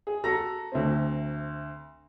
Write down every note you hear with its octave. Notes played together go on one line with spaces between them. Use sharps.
G#4
F#4 A4 A#5 A#6
D2 A3 C4